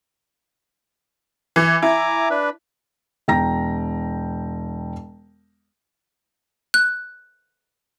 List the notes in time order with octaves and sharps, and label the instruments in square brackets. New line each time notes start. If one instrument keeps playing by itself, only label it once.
[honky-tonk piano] E3
[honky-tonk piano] E4 [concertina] G#5 A#5 D6
[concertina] D4 B4
[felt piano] E1 G5 A#5 A#6
[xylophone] F#6